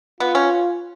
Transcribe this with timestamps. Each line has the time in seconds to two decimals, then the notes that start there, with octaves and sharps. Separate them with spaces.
0.20 B3 F4
0.35 C#4